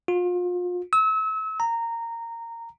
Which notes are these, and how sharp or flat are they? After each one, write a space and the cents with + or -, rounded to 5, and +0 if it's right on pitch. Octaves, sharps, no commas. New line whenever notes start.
F4 +35
E6 -35
A#5 -15